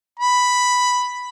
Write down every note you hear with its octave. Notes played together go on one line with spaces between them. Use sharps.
B5